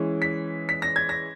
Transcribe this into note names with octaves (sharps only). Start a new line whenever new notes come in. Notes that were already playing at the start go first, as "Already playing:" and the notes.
Already playing: E3 G#3 C#4
B6
B6
A#6
G#6
A#6